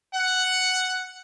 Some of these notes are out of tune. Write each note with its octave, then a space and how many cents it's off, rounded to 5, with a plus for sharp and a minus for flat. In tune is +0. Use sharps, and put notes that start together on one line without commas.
F#5 +5